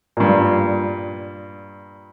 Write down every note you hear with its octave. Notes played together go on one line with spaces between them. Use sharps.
G2 A#2